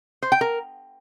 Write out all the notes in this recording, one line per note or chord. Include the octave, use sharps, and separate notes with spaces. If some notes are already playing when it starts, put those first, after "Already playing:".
C5
G5
A#4